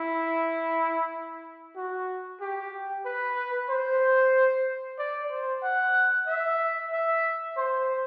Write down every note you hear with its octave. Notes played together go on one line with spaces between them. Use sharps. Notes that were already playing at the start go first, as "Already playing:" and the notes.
Already playing: E4
F#4
G4
B4
C5
D5
C5
F#5
E5
E5
C5